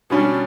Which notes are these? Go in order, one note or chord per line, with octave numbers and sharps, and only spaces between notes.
B2 G3 C#4 D4